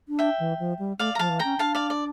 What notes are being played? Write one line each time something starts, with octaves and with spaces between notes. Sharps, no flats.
D4
E5 G5
E3
F3
G3
A3 D5 F5
A#5
F3 F5 A5
E3
C#4 G5 A#5
D4 F5 A5
D5 F5
D5